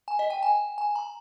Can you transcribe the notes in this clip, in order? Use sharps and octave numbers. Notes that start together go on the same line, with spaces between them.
G#5
D#5
G5
G#5
G#5
A#5